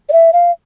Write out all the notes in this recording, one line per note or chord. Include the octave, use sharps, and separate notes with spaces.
D5
E5
F5